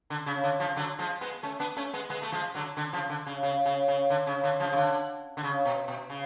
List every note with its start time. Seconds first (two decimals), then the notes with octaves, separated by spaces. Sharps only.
0.10 D3
0.26 C#3
0.44 D3
0.60 C#3 F3
0.77 D3 F#3
0.99 F3 G#3
1.21 G#3 B3
1.43 A3 C#4
1.59 B3 D4
1.77 A3 C#4
1.93 G#3 B3
2.10 G#3 B3
2.22 A3
2.32 F3 G#3
2.55 D3 F#3
2.77 D3
2.93 C#3 F3
3.10 D3
3.27 C#3
3.43 C#3
3.66 C#3
3.88 C#3
4.10 D3
4.27 C#3
4.44 D3
4.60 C#3 F3
4.72 C#3
4.76 D3
5.37 D3
5.43 C#3
5.65 B2
5.88 B2
6.10 C#3